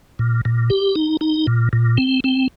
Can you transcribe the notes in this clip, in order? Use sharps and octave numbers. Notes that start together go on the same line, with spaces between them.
A#2
A#2
G4
D#4
D#4
A#2
A#2
C4
C4